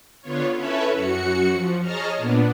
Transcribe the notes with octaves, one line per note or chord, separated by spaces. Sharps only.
D3 B3 F4 C#5
C#4 E4 A4 B4 C#5 E5
F#2 F#4 C#7
F3
G#4 C#5 D#5 A5 A#5 F6
A#2 B3 D4